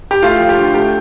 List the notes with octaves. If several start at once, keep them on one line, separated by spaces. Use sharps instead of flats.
G4
A3 F4
F3
G4
D3
A3 G4